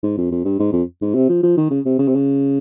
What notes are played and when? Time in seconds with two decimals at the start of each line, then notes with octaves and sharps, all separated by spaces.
0.03 G#2
0.18 F2
0.31 F2
0.45 G2
0.59 G#2
0.73 F2
1.02 G#2
1.15 C3
1.29 F3
1.43 F3
1.57 D#3
1.71 C#3
1.85 C3
1.99 C#3
2.08 C3
2.15 C#3